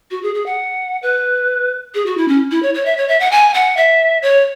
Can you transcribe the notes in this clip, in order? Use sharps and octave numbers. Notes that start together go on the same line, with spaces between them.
F#4
G#4
G#4
F#5
B4
G#4
F#4
E4
C#4
E4
C#5
C#5
E5
C#5
E5
F#5
G#5
F#5
E5
C#5